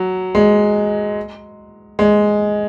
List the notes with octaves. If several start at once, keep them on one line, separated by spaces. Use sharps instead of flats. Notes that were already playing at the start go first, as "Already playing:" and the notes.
Already playing: F#3
G#3
G#3